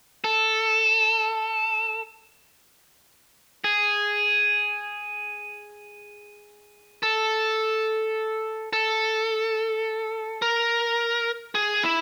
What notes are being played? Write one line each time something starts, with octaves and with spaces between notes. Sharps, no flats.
A4
G#4
A4
A4
A#4
G#4
E4